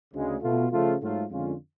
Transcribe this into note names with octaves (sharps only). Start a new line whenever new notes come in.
D2 C#3 G#3
B2 A3 F4
C#3 F3 A3 F4
G#2 F#3 A3 F4
F2 D3 G#3 C#4 F4